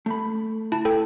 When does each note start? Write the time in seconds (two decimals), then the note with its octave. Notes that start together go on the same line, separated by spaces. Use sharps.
0.06 A3 B5
0.72 E4 A5
0.85 A4 G5